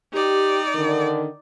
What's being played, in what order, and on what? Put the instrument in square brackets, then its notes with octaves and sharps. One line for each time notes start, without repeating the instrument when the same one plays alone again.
[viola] D#4 D5 [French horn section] G4
[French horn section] D3 D#3